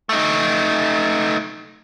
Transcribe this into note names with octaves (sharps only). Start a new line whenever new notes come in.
A3 D#4